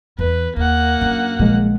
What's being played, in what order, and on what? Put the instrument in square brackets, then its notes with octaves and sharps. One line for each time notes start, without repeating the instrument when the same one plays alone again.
[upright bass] E2 E3 [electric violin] B4
[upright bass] D#2 [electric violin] A#3 F#5
[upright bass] F#2 D4
[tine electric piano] A#1 G#3 [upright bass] D#3